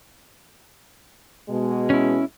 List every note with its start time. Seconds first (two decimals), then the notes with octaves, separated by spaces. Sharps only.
1.49 B2 G#3
1.90 C#4 E4